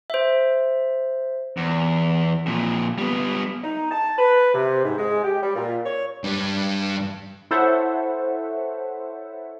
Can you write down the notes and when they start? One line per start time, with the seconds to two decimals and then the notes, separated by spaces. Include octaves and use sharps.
0.10 C5 E5
1.57 E2
2.46 F2 A#2
2.98 G3 B3
3.63 D#4
3.91 A5
4.18 B4
4.54 C3
4.84 G#2
4.98 G#3
5.24 G4
5.43 G3
5.56 A#2
5.86 C#5
6.24 G2 G3
7.51 E4 A4 C5 C#5 E5 F#5